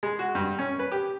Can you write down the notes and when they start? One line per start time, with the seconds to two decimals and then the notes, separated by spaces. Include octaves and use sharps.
0.03 G#3
0.19 F#4
0.35 G2
0.59 C#4
0.79 B4
0.92 G4